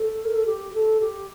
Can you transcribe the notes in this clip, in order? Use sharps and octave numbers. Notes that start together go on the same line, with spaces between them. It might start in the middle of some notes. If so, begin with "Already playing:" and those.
Already playing: A4
A#4
A4
G4
A4
G4